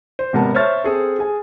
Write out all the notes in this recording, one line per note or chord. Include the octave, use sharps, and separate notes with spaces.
C5
G#1 C3 B3 A#4 A5
C5 C#5 E5 F6 A6
C4 G#4 A4
G#4 G#5